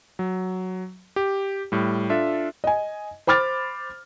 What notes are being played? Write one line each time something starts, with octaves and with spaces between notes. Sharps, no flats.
F#3
G4
A2 G3
D4 F4 A4 E5
D#5 G#5
C5 B5 D6 F6 A6